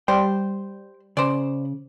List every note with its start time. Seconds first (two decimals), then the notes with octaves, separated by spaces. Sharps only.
0.08 G3 C5 G5
1.17 C#3 C5 D5